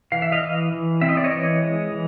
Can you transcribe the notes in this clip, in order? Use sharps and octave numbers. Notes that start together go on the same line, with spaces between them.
E3 F5
E5
D#5 F5
E3
E3
C4 E5
D#5
D5
C#5 D#5
E3
G#3
E3